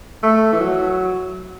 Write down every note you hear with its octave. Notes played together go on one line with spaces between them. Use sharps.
A3
E3
F#3